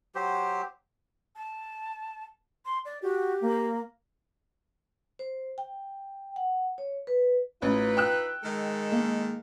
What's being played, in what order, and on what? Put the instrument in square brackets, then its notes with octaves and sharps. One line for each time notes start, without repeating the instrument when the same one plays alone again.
[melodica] F#3 G4 C5
[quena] A5
C6
D5
[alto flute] F#4 [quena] G4
[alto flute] A#3
[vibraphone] C5
G5
F#5
C#5
B4
[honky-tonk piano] A1 [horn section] D#4 F4 B4
[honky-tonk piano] G5 E6 F#6
[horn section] D#3 G#3 A4
[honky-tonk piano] A#3